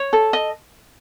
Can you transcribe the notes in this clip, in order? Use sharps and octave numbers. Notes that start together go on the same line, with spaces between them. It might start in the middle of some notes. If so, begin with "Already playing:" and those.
Already playing: C#5
A4
D#5